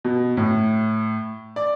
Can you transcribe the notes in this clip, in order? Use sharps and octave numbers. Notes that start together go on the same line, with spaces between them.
B2
A2
D5